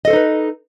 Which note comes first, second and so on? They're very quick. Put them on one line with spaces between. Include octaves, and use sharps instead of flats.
D#5 A4 C5 D#4 B4